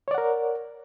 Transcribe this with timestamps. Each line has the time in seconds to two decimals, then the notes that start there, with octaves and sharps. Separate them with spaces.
0.08 C#5
0.11 D5
0.14 F#5
0.18 A#4